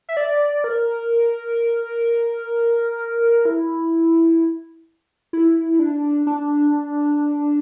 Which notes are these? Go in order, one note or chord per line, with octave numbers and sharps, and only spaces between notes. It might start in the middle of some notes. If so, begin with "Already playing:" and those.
E5
D5
A#4
E4
E4
D4
D4